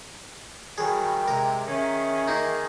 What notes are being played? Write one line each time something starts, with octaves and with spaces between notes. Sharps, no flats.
D#3 F#3 G3 G#4 G5
C3 G#3 A#4
D#3 C#4 G#4 E5
A#3 D#4